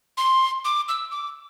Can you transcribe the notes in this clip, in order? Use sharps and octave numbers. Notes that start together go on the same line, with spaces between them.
C6
D6
E6
D6